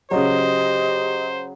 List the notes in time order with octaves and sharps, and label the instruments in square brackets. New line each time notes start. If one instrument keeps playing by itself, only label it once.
[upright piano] C#3 F#3 [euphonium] G4 [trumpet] C5 [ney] D#5